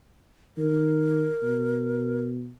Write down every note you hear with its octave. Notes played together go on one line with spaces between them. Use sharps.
D#3 A#4
B2